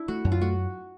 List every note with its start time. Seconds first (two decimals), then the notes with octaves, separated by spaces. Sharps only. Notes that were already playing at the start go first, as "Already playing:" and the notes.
Already playing: D4 E4
0.08 A3 F#4
0.25 F#2
0.32 F4
0.41 A3 F#4